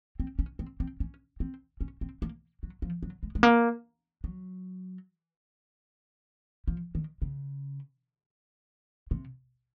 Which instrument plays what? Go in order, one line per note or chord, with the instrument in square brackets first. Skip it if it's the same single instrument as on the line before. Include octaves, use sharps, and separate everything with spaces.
[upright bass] C4
C#4
C4
C4
C#4
C4
C#4
C4
A#3
F#3
F3
F#3
G#3
G#3
A#3
F#3
F3
D#3
C#3
C3